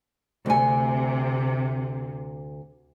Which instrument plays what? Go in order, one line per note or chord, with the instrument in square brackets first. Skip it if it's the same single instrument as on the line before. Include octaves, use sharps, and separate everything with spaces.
[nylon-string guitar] D2 G#5 [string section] C3